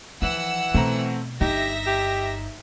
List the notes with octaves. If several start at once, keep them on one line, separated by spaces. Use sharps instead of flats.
E3 F3 F#5 E6
B2 A3 C4 A#5
G1 D#4 G4 E5 A#6
G4